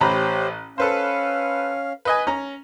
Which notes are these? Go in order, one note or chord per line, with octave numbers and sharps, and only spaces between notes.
A1 G4 C5 C#5 A#5 B5
C#4 A4 B4 C5 F5
B4 D#5 G#5
C#4 A#5